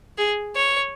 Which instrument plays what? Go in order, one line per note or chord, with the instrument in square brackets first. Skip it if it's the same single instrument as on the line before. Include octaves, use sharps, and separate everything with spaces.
[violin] G#4
C#5